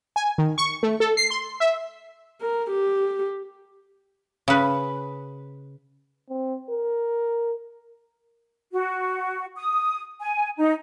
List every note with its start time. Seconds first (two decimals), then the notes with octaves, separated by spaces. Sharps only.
0.16 G#5
0.38 D#3
0.58 C#6
0.83 A3
1.00 A4
1.17 C7
1.30 C6
1.60 E5
2.41 A#4
2.71 G4
4.48 C#3 B4
6.30 C4
6.70 A#4
8.72 F#4
9.56 D#6
10.20 G#5
10.57 D#4